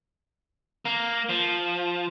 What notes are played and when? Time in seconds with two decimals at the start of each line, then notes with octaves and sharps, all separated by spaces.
0.85 A#3
1.29 F3